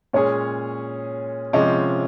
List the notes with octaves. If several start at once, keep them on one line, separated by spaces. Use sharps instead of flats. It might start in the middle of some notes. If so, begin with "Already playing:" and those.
A#2 G#3 C#4 G#4 C#5
C3 F3 G#3 C#4 D#5